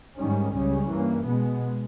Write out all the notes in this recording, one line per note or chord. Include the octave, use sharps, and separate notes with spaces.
G#2 D#3 G3 C#4
C#2 C#3 G3 C#4
G2 E3 A#3
B2 G#3 B3